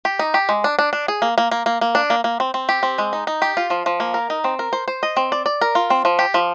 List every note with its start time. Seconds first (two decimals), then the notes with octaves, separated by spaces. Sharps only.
0.05 G4
0.19 D#4
0.34 G4
0.49 G#3
0.64 D4
0.79 D4
0.93 D4
1.08 G#4
1.22 A#3
1.38 A#3
1.51 A#3
1.66 A#3
1.81 A#3
1.95 D4
2.10 A#3
2.24 A#3
2.40 C4
2.54 C4
2.69 G4
2.83 C4
2.98 G#3
3.13 D#4
3.27 D#4
3.42 G4
3.57 F4
3.70 F3
3.86 F3
4.00 A#3
4.14 A#4
4.30 D#4
4.44 C4
4.59 A#4
4.73 C5
4.88 C5
5.03 D#5
5.17 C4
5.32 D5
5.46 D5
5.61 A#4
5.75 F4
5.90 C4
6.05 F3
6.19 G4
6.34 F3